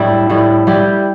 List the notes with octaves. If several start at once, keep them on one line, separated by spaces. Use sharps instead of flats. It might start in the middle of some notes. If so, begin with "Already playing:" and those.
Already playing: A2 G3 D4 E4
A2 G3 E4
G3 E4 G4